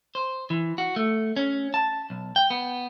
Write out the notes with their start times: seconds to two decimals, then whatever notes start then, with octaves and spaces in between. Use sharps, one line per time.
0.15 C5
0.50 E3
0.78 F#4
0.96 A3
1.36 C#4
1.74 A5
2.10 B1
2.36 G5
2.50 B3